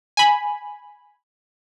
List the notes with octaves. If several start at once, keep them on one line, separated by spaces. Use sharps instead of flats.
G#5 B5